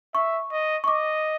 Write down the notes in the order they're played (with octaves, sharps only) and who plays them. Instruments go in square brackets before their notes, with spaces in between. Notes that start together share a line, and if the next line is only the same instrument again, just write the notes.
[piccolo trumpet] E5 [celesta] C#6
[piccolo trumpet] D#5
[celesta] C#6
[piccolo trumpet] D#5 [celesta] D6